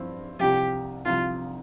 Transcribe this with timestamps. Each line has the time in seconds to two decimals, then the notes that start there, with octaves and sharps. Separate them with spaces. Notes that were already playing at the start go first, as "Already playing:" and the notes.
Already playing: G2 F3 C4 E4
0.39 C2 C3 F3 G4
1.06 C2 C3 F3 F4